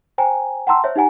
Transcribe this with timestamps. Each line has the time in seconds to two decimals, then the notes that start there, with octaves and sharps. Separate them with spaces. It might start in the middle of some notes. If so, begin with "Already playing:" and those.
0.18 C5 G5 G#5 A#5
0.67 F#5 G5 A5 A#5 C6 E6
0.84 C5 C#5 E5
0.96 D#4 G4 F#5 G#5 A#5